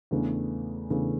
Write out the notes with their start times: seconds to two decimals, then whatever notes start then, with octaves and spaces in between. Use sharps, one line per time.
0.11 E2 C#3 E3 A3 D4
0.90 E2 C#3 E3 A3 D4